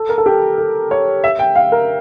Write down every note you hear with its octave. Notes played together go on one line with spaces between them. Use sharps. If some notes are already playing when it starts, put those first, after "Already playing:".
Already playing: A4
A#4
A4
G4
A4
C#5
E5
G5
F5
A#4